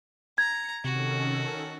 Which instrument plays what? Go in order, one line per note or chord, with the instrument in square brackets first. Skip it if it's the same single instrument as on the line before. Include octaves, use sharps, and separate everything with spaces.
[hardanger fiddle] A#5 [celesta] G#6 [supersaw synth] C#7
[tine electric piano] C3 [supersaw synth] D#3 C#4 A4 [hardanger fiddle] F#4